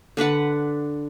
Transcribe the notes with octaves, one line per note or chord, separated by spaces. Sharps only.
D3 D4 B4 F#5